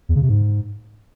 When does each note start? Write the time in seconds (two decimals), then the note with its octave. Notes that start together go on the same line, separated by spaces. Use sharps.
0.09 E2
0.16 C#3
0.22 C3
0.29 G#2